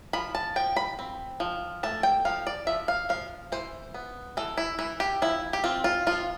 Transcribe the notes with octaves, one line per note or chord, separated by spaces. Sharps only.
F3 B5
A5
F3 G5
B5
C4
F3
A3 A5
G5
F3 F5
D5
F3 E5
F5
F3 F5
E3 C5
B3
E3 A4
E4
E3 E4
G4
F3 E4
G4
C4 F4
F4
F3 F4